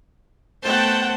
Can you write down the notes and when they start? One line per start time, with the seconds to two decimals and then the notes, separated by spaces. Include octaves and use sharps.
0.63 A3 B3 C5 F#5 G5 A5